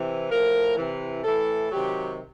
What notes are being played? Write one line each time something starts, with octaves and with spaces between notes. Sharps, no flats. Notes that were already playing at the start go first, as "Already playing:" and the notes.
Already playing: C3 E3
A2 F3 A#4
C3 E3
A2 E3 A4
C3 D#3 F#3 G4